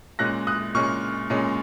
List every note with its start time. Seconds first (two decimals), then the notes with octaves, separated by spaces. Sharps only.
0.19 A#2 G#3 C#4 F#6 A#6
0.47 D#6 F#6
0.74 A#2 G#3 C#4 C#6 F6
1.30 A#2 G#3 C#4